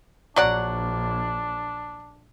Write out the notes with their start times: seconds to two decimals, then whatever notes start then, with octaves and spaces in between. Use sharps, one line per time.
0.36 A#1 F#3 D4 D5 F#5